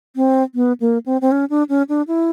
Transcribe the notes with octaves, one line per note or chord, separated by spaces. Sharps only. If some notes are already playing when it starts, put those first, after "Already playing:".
C4
B3
A#3
C4
C4
C#4
D4
C#4
D4
E4